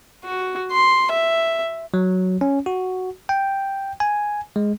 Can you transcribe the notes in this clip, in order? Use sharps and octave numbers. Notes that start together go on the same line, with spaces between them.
F#4
C6
E5
F#3
C#4
F#4
G5
G#5
G#3